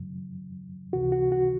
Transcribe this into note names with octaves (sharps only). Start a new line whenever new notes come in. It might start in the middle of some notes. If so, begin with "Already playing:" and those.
Already playing: F#2 C#3 F#3
C#2 C3 E3 F#4
F#4
F#4